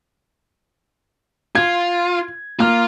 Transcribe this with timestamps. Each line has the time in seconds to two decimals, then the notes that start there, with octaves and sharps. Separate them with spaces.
1.55 F4 G#6
2.59 A#3 F4 F6